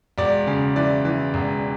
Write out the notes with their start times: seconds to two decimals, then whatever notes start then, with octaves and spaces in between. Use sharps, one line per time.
0.18 E1 D5
0.47 C#3
0.76 E3 D5
1.05 E3
1.34 E1